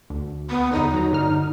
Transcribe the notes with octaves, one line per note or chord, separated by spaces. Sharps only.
D2
B3
E2 D3 D#4
F#3 A#5
G1 D3 F6